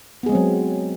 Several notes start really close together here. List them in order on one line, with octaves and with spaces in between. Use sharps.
B3 G#4 G#3 C4 F#3